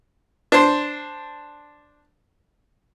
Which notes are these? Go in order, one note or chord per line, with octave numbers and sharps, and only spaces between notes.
D4 C5